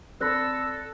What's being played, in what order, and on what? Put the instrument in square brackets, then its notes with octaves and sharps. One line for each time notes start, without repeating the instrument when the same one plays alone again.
[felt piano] C4 B5 [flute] A4 [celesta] D5 F#6 A#6 [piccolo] E6